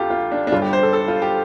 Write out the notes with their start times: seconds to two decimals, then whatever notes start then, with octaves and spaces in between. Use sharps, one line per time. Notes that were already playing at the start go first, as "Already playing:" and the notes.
Already playing: D2 C3 F4 G4 A4
0.10 F4
0.32 D4
0.47 D4
0.52 G1 G2 D3 F4
0.62 G4
0.73 C5
0.83 A4
0.93 A4
1.08 F4
1.22 G4